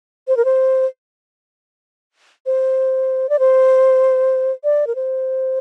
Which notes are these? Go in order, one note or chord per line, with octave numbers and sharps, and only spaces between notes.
C5
A#4
C5
C5
D5
C5
D5
A#4
C5